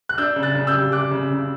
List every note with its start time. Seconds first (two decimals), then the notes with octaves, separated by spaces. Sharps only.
0.09 F#6
0.18 D4 E6 G6
0.36 C#3
0.43 F#6 A6
0.55 C#3
0.67 E6 G6
0.73 G3
0.92 G3 D6 F#6
1.11 C#3
1.30 C#3